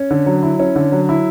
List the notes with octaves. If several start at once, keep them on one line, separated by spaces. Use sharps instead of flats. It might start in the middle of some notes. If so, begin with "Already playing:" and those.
Already playing: C#4
D3
F#3
E4
C#4
D3
F#3
E4